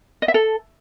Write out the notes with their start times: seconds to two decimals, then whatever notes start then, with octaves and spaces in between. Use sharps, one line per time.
0.22 D#5
0.28 E5
0.34 A4